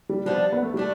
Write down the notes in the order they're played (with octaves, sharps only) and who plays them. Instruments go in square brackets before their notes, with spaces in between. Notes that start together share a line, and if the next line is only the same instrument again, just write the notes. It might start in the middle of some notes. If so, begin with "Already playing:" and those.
[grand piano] G3
[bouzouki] F3 B3 D4 [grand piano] G3
[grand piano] B3
A3
[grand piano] G3 [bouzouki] A3 D4